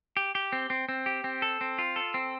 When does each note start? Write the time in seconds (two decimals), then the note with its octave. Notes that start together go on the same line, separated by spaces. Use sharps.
0.17 G4
0.35 G4
0.52 C4
0.70 C4
0.89 C4
1.06 G4
1.24 C4
1.42 A4
1.61 C4
1.79 F4
1.96 A4
2.14 C4